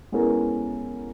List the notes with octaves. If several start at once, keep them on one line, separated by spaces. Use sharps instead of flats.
G#3 B3 C#4 E4 A4 A#4